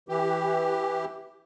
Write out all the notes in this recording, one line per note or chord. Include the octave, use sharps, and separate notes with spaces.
E3 G4